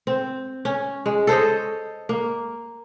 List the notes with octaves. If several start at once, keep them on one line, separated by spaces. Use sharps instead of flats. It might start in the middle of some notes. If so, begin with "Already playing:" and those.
C4
C#4
G#3
A4 C5 C#5 D#5
A#3